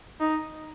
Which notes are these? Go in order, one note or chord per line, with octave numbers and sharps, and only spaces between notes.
D#4